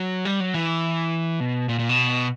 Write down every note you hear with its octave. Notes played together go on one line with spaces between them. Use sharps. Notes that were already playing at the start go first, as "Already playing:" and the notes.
Already playing: F#3
G3
F#3
E3
B2
A#2
A#2
B2